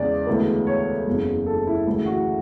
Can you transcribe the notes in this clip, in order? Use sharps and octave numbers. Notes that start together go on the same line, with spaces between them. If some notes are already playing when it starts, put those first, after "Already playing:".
Already playing: E2 C#3 G#3 C#4 D5
D2 C#3 E3 G#3 B3
C#5
F#1 E2 C#3
A4
E4
D2 C#3 E3 E4
F#4